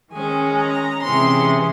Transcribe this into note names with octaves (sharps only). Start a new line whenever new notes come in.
D#3 G#3 C#4 G#5
A#5
C3 E3 G#3 C#4 C6